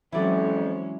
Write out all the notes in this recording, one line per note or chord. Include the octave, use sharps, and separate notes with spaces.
F2 E3 F#3 G#3 C#4 E4 D5